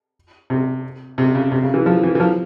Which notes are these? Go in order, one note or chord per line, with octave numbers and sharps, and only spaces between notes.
C3
C3
C#3
C3
C#3
E3
F3
E3
E3
F3